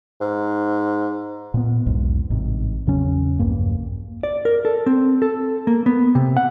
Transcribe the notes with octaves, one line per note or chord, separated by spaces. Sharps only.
G#2
A#2 B3
B1 E2 G#2
A1 G#2 C3
E2 C#3 F#3 C#4
A#1 E2 G2 A#3
D5
A#4
A4
C4
A4
A#3
B3
C3
F#5